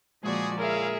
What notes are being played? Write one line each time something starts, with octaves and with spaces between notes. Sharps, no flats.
A#2 D3 F3 G#3 F#4 G#4 D5
E4 G#4 A#4 C#5 E5 F5